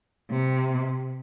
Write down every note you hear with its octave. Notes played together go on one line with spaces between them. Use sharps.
C3